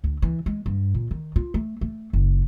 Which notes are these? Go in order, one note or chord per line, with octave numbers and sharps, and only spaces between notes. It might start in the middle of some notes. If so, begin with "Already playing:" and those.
D2
E3
G#3
G2
A#2
D#3
F4
A3
A3
F#1